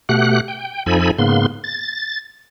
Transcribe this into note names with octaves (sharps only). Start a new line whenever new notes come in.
B2 A3 G4 F#5 F#6
G5
F2 F3 D#4 A4 G#5 B5
G#2 C#3 A#3 B3 C6
A6